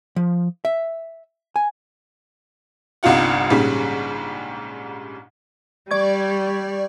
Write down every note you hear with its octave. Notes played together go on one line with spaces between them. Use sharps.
F3
E5
G#5
G1 C2 D#4 F4 F#5
A#1 G#2 C#3 G3
G3 D5 C#6 G#6